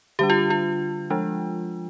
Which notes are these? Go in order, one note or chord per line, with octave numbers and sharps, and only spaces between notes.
D3 G3 D4 G4
F4
F4
F3 G#3 D4